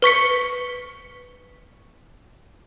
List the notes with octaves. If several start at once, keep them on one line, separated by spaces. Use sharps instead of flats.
B4 C#6 B6 C#7